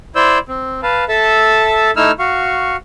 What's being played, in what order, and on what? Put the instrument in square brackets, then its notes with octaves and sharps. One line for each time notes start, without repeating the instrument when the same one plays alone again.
[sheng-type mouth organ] E4 C5 D5 E6 G6
C4
B4 F5 A5
A4 E5 A5
A3 D#4 E4 E6 F6
F#4 F5 C#6